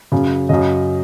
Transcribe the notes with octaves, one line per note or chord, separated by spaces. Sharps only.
F#2 C#3
F#2 C#3 D#5